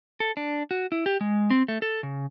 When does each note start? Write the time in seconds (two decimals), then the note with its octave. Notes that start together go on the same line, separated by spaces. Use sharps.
0.20 A4
0.37 D4
0.71 F#4
0.92 E4
1.06 G4
1.21 G#3
1.50 C4
1.68 A3
1.82 A4
2.03 C#3